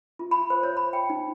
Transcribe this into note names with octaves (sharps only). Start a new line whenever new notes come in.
F4
B5
C5
C#5
B5
G5
D#4